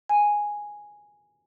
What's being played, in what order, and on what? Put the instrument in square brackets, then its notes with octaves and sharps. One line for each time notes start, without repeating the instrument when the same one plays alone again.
[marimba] G#5